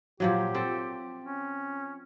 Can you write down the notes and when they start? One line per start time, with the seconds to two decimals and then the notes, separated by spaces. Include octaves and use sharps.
0.20 A#2 F3 F#3 G4
0.54 C4 A4
1.24 C#4